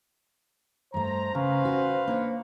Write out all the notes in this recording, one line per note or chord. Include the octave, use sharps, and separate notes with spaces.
G2 A3 C5 A#5
C#3 C#4 B4 F5
F#4
A#3 D4 C#5